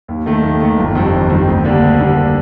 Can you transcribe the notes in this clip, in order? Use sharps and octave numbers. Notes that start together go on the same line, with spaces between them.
D#2
D#3 A3
D#2
D#3 A3
G1
F2 D#3 G3 C4
G1
F2 D#3 G3 C4
D2
D3 G3 A#3 D4
D2
D3 G3 A#3 D4